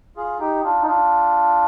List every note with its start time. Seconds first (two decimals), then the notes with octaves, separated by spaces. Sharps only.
0.17 F4 G#4
0.40 D#4 G4
0.64 D4 F4
0.82 D#4
0.87 D4 F4